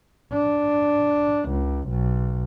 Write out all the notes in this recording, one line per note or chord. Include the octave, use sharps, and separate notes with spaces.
D4
C#2
B1